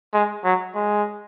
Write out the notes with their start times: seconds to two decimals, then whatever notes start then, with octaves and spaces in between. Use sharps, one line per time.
0.14 G#3
0.44 F#3
0.75 G#3